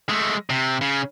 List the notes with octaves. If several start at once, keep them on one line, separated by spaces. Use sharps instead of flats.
G#3 A3
C3
C#3